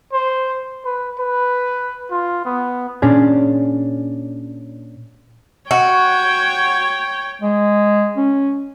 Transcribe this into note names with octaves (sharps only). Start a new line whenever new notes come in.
C5
B4
B4
F4
B3
A#2 C#4 D4 G#4
F#4 C#5 G5
G#3
C#4